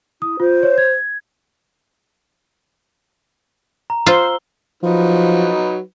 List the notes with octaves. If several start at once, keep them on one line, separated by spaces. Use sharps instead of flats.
E4 D#6
F4 C5
C#5
G#6
A#5
F4 C5 E6 C7 G7
F3 F#3 D#4 B4